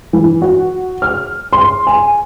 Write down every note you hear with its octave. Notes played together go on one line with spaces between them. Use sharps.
E3
F#4
F6
C6
G#5